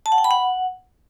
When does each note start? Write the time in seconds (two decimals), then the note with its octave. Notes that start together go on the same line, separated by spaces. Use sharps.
0.06 A5
0.12 F#5
0.18 G5
0.24 B5
0.31 F#5